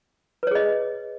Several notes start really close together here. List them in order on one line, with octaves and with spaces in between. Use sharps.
B4 C#5 G#4 D#5